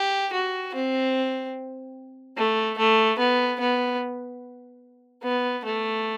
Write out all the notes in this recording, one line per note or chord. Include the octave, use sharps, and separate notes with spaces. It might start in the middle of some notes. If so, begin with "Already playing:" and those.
Already playing: G4
F#4
C4
A3
A3
B3
B3
B3
A3